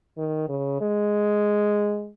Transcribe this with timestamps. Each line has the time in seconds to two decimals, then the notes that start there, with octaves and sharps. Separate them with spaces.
0.17 D#3
0.49 C#3
0.81 G#3